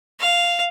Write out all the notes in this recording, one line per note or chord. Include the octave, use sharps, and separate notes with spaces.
F5